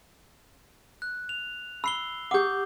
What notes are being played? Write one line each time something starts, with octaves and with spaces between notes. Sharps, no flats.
F#6
F7
B5 E6 C7 G7
G4 F#5 D6 D#6 G6